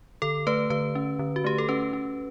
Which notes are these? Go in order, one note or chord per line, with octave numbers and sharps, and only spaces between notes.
D3 A4
A3 B4
D3 B4
C#4
D3
F#4
A3 G4
A4
C#4 B4
C#4